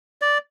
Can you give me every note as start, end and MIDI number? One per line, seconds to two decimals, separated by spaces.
0.22 0.38 74